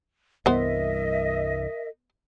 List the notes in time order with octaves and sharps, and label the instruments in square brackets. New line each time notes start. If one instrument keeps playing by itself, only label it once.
[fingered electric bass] C2 G2 E3 [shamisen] B3 C5 [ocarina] A#4 [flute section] D#5 E5